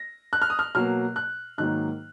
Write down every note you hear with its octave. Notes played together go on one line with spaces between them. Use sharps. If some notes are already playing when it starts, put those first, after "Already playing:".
Already playing: A#6
F#6
F6
D#6
F6
B2 F#3 A#3 F6
F#6
G#2 D#3 F#3 A#3 F#6